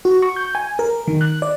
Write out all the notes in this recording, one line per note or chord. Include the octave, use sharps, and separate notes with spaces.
F#4
C#6
G6
G#5
A#4
D#3
F#6
D5